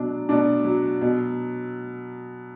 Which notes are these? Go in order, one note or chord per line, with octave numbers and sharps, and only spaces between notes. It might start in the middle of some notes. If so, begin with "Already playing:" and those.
Already playing: B2 F#3 D4
B2 D4
F#3
B2